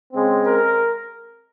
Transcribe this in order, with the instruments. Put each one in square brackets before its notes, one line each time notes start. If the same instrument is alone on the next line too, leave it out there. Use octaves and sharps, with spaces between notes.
[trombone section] C#3 G#3 C4
A#4